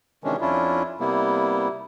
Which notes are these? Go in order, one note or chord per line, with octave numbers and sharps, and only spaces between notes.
C3 D#3 E3 G#3 C#4 D4
F2 C#4 D4 E4 F4
C3 G3 A#3 B3 E4